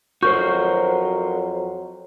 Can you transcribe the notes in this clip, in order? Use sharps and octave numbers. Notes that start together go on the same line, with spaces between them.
F2 F#3 F#4 A#4 C5 C#6 G6